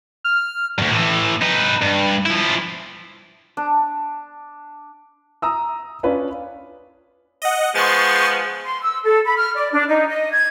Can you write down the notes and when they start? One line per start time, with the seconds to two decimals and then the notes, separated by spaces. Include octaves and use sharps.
0.24 F6
0.78 D2 G2
0.92 A2 E3
1.41 D#4 B4
1.82 G2
2.26 F3 E4
3.57 D4
5.42 A#5 D#6 E6
6.03 C#4 D4 F4 B4
7.42 D#5 F#5
7.75 F3 G#3 B3 C6 C#6 A6
8.64 C6
8.81 E6
9.03 A4
9.24 B5
9.36 F6
9.54 D5
9.72 D4
9.87 D#4
10.09 D#5
10.32 G#6